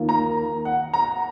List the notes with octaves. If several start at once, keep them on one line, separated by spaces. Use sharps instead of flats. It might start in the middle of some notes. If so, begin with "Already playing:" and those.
Already playing: D#2 D#3 A#3 F4
A#5
F#5
A#5